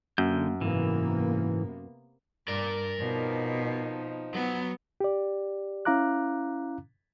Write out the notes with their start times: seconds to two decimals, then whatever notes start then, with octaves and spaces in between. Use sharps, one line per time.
0.18 F#2 D3 A#3 G6
0.61 G#2 C3 E3 A#3 B3
2.48 G2 A#4 D5
3.00 B2 F3 C4 D#4
4.34 F#3 B3
5.00 G4 D5
5.85 C#4 E4 F5 A#5 D6 F#6